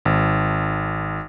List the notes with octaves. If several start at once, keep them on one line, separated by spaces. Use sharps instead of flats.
G#1